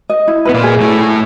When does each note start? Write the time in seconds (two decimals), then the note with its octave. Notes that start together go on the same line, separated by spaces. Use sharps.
0.09 D#5
0.28 E4
0.45 B3 B4
0.54 A#2 A#3
0.63 G#4
0.81 A2 A3 E4
0.99 E4